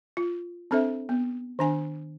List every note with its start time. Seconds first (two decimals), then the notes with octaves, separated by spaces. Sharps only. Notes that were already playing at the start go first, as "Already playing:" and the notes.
0.17 F4
0.71 C4 D4 A4 C5 E5
1.09 B3
1.59 D#3 D4 G#5